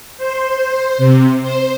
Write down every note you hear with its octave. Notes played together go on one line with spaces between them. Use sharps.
C5
C3
C5